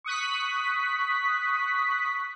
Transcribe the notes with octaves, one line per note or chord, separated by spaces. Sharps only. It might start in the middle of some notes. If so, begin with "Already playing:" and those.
C#6 D#6 F#6 B6